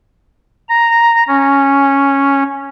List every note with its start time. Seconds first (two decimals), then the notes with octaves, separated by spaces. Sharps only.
0.69 A#5
1.28 C#4